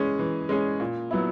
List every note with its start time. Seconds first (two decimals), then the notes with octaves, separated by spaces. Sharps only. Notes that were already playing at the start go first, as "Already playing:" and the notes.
Already playing: E3 G#3 C#4 G#4
0.19 E3
0.49 G#3 C#4 G#4
0.80 A#2
1.11 F#3 B3 E4